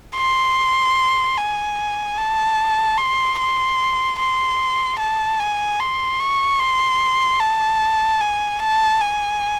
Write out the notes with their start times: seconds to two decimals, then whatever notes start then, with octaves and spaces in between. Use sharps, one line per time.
0.17 C6
1.38 G#5
2.17 A5
2.98 C6
3.39 C6
4.19 C6
4.99 A5
5.39 G#5
5.80 C6
6.20 C#6
6.59 C6
7.40 A5
8.21 G#5
8.60 A5
9.01 G#5